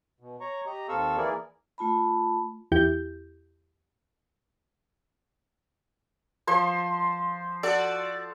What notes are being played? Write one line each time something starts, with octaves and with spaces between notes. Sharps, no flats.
B2
C#5 A#5 C#6
G4 D#5 A#5
D#2 C4 A4 F5 C#6 E6
E3 A#3 E4 G#4 A#4 D5
A3 F4 A5 B5
E2 E4 G4 G6
F3 C5 C6
F#4 A4 D5